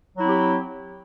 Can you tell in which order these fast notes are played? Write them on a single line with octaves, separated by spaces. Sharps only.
F#3 E4 C4 G4